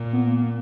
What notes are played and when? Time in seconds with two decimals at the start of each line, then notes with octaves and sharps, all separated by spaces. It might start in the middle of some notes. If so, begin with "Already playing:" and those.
Already playing: A#2
0.13 B3
0.27 A#3
0.41 A#3